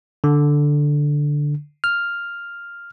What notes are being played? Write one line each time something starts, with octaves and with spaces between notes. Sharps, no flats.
D3
F6